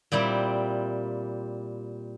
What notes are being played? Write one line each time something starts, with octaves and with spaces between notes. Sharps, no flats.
A#2 G3 C4 E4